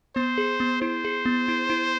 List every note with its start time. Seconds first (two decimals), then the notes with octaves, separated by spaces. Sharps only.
0.16 B3 C5
0.38 G#4
0.60 B3
0.82 E4 C5
1.05 G#4
1.26 B3
1.48 E4
1.70 E4